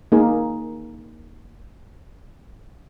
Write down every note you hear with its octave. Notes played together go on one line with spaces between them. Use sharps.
A#3 D#4 G#4 A#4